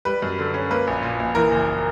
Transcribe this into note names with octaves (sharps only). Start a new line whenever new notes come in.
G3 B4
F#2
D3
C#4
A#3 B4
A#1
A#2
A#1
E3 A#4
F#1